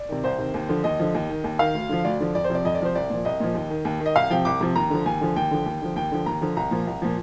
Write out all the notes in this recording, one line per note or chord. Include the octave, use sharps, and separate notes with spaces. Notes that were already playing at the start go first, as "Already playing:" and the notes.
Already playing: D5
C3 D#3
C2 C5
C3 D#3
D#2
D3 F3
D#2 D#5
D3 F3
D#2
D#3
D#2
D#3 F5
D2
D3 F3
D2 D5
D3 F3
F2 D5
C5
C3 F3 D5
F2 D#5
D5
C3 F3 C5
C2 D5
A#2 F3
C2 D#5
A#2 F3
D#2
D#3
D#2
D#3
D#5
C2 F5
C3 F3 G5
C2 D6
C3 F3
D#2 A#5
D3 F3
D#2 G#5
D3 F3
D#2 G5
D3 F3
D#2
D3 F3
D#2 G5
D3 F3
D#2 A#5
D3 F3
C2 A#5
A#2 F3
C2
A#2 F3